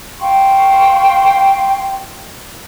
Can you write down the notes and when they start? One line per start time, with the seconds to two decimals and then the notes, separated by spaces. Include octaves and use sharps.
0.21 F5 G5 C6 C#6